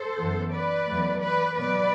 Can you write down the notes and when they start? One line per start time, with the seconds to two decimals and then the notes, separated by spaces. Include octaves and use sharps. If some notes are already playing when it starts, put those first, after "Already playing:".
Already playing: A4 C5
0.17 F#2 E3 B3
0.52 B4 D5
0.88 E2 B2 F#3 A3
1.23 B4 D5
1.59 B2 F#3 B3 B4 D5